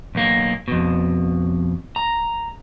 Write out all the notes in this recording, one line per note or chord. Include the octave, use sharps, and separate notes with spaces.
B1 A#3
F2 B2
A#5